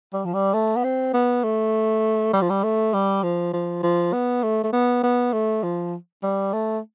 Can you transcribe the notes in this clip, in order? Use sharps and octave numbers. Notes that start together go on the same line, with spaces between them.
G3
F3
G3
A3
B3
C4
B3
A3
G3
F3
G3
A3
G3
F3
F3
F3
B3
A3
A3
B3
B3
A3
F3
G3
A3